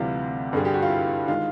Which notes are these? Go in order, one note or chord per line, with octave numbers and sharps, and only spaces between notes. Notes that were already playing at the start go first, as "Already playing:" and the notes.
Already playing: D2 C3 E3 G3 F4
G2 D3 G3 G#4
G4
F#4
F4
E4
D#3 G#3 F4